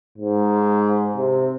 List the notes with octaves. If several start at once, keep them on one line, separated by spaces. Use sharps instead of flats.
G#2
C3